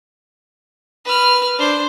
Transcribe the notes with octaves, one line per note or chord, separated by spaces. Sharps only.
B4 F6
D4 C5